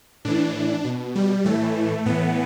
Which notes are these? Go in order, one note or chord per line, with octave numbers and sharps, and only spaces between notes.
A2 E3 D4
B2
G3
A2 E3 A3
A2 E3 B3